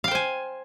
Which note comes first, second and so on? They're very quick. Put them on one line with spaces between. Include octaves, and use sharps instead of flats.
F5 G5 C5 G#5